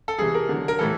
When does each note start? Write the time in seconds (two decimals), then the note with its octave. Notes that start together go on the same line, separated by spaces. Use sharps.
0.08 A4
0.19 C3 E3 G3 G#4
0.35 A#4
0.49 D3 F#3
0.68 A#4
0.79 A2 E3 G3 A4